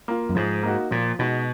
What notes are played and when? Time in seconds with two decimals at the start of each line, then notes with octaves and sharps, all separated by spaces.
0.08 A#3 F4
0.29 F#2
0.35 G#2 F3
0.63 A#3 D#4 F#4
0.91 A#2 F3
1.19 B2 G#3 D#4 F#4